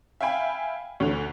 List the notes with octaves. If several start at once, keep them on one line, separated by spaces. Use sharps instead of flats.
E5 F5 G5 G#5 B5
D2 D3